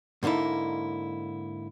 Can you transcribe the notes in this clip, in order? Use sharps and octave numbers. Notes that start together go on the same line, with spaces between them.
G#2 D3 A#3 D#4 E4